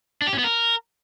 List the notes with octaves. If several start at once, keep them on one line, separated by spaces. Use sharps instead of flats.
D4
G4
C#4
B3
A#4